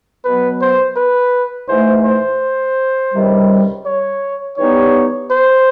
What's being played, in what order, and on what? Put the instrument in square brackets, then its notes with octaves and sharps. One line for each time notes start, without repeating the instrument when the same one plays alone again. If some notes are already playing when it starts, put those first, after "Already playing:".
[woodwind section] B2 F#3 B3 [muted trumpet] B4
[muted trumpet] C5
B4
[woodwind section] G#2 E3 A3 [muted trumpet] C5
[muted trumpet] C5
[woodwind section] C#2 C3 D#3 G3
[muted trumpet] C#5
[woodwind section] E3 G3 B3 D#4 G4 [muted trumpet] C#5
[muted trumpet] C5